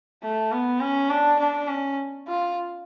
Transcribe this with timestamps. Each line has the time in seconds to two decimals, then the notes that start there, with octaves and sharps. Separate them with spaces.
0.23 A3
0.52 B3
0.80 C#4
1.10 D4
1.39 D4
1.68 C#4
2.28 F4